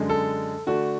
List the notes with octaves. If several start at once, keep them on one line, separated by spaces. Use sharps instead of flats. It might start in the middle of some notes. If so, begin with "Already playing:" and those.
Already playing: F#2 D3 G#3
A4
D3 A3 D4 F#4